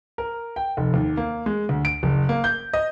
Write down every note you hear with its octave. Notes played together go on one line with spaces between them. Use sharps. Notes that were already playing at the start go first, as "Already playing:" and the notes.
A#4
G5
F1
D#2
A#3
G#3
D2
D7
F#1
A#3
G6
D#5